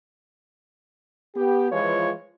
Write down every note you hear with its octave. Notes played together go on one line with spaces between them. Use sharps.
B3 G4
E3 F3 G#3 F4 B4 C#5